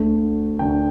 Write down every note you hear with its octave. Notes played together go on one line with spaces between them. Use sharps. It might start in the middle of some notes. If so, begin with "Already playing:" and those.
Already playing: D2 D3 A3
D2 D3 A3 G5